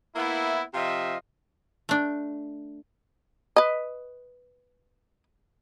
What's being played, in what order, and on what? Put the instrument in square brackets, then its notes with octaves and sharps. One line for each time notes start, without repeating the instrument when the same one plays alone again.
[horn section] A#3 B3 E4
C3 F3 F4 D#5 E5
[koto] A3 D4
[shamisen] B4 D#5